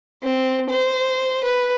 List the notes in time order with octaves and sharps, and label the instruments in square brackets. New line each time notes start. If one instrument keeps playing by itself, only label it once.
[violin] C4
C5
B4